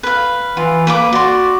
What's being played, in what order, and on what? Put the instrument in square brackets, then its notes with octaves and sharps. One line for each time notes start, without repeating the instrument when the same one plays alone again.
[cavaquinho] B4 F5
[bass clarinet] E3 [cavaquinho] F4
[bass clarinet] A#3 [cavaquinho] B4 B5 D6
[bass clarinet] F#4 [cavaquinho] D5 C6